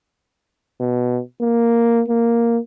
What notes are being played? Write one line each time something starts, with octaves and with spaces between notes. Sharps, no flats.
B2
A#3
A#3